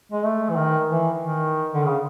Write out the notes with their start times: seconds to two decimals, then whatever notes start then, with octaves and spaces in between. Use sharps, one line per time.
0.12 G#3
0.24 A3
0.50 E3
0.56 D#3
0.88 E3
1.20 D#3
1.74 D3
1.85 C#3